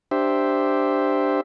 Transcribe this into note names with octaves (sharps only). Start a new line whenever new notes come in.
D4 G4 C5 E5